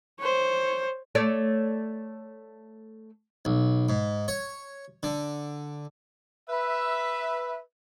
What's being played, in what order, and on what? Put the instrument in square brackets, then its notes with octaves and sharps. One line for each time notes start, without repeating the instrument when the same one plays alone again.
[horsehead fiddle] C5 C#5
[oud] A3 C#5 D5
[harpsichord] B1
G#2
C#5
D3
[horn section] B4 E5